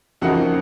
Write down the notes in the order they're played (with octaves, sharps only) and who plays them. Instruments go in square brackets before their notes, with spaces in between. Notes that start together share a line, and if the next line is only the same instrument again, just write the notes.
[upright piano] F2 C#3 F3 A#3 D#4 F#4 F#5